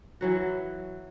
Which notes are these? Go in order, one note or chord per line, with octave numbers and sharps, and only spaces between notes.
E3 F#3 F#4